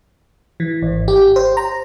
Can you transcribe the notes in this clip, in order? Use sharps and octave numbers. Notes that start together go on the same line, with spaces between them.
E3
G#1
G4
C5
A#5